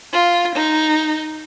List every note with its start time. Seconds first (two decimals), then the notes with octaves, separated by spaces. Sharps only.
0.13 F4
0.56 D#4